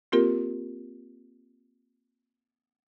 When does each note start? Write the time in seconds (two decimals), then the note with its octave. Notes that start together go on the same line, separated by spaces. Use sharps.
0.12 A#3 C4 F4 G4 A#4